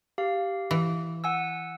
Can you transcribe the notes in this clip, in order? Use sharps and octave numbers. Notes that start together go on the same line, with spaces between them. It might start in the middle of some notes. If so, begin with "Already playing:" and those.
G4 F5
E3
F#5 G#5 E6